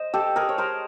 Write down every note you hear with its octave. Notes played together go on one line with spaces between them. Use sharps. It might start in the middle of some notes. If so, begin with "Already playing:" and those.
Already playing: C5 D#5
G4 A4
G#4 A#4
C#5
A#4 C5